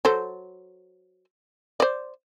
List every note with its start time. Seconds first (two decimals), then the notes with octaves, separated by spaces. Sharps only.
0.05 F#3 A4 C5
1.80 C5 D5